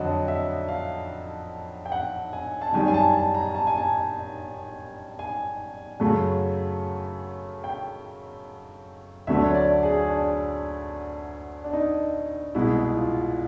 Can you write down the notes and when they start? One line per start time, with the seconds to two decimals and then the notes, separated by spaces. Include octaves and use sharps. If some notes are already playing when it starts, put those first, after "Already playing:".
Already playing: F2 D3 F#3 D5 D#5
0.28 E5
0.68 F5
1.86 G5
1.92 F#5
2.33 G#5
2.61 A5
2.73 F#2 D#3 G3 G#5
2.88 G#5
2.94 A5
3.13 A5
3.35 A#5
3.54 A5
3.67 G#5
3.77 A5
5.19 G#5
6.00 F#2 C#3 F#3 A3
7.64 G5
9.27 D2 D3 F#3 A3 E5
9.44 C#5
9.54 D5
9.83 G#4
10.10 D4
11.64 D4
11.73 D#4
12.55 C2 B2 G#3 E4
12.97 F4